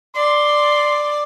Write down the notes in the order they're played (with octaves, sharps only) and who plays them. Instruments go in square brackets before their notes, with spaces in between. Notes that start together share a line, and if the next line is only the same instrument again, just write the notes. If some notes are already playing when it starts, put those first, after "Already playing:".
[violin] D5 [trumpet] C6